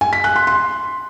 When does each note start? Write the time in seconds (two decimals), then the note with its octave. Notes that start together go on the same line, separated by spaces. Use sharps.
0.01 G#5
0.13 B6
0.24 F#6
0.36 C6
0.47 C6